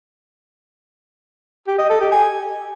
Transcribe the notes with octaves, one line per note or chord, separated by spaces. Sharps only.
G4
D#5
A4
G4
G#5